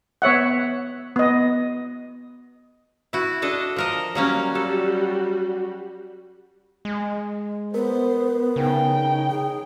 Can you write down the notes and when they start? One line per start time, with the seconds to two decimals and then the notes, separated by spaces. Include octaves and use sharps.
0.22 B3 C#5 E5 F#5
1.16 B3 D#5
3.13 E4 F#4
3.42 D4 A4 D#5
3.76 F3 A#4 D#5
4.15 F#3 G3 A#3 C#4 F#4
4.55 A4
6.85 G#3
7.74 B3 A#4 C5
8.56 C#3 D#4 G5
9.30 G#4